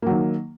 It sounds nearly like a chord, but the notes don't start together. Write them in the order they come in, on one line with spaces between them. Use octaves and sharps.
A#3 F#3 D#3